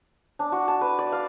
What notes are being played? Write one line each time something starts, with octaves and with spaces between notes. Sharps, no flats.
D4
F#4
A5
B4
D5
F5